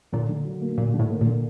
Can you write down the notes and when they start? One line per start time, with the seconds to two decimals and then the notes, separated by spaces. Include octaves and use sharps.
0.12 A#2 D3
0.29 D3
0.45 F#3
0.61 A#3
0.78 A#2 D3
0.94 D3
0.99 A2
1.10 A#3
1.21 A#2
1.27 D3